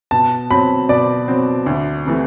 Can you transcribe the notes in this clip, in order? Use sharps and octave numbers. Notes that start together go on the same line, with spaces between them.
B2 A5
F#3 C4 B5
B2 D5
F#3 C4
D2
C3 E3 A3